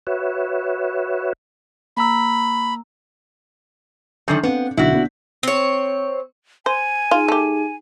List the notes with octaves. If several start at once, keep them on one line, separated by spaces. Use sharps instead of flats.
F#4 B4 C#5 E5
A#3 A#5 B5 E6
F#2 D3 D#3 G6
B3 C4 F5
B1 D3 E4 F#4 B6
B3 D4
C4 C#5
C5 G#5
D#4 F4 G#4
A3 G4